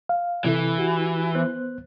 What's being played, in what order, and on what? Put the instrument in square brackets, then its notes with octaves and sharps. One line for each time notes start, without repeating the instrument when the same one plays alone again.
[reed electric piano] F5
[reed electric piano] C3 E4 A4 [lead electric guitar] E3
[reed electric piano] F#4 G4
B3 C5 F#6